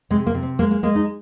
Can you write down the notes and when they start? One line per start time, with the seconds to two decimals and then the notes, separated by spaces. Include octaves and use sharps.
0.10 C3 G#3
0.27 A#3
0.34 C3
0.43 C4
0.59 G#3 A#3
0.71 A#3
0.83 G#3 A#3
0.95 D#4